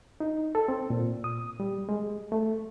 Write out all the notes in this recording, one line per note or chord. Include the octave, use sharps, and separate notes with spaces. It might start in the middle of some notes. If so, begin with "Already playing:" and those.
D#4
A4
C4
A#2
D#6
G3
G#3
A3